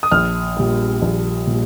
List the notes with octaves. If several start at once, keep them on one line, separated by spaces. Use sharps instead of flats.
D#6
A#1 F6
A#2 G3
A#1
A#2 G3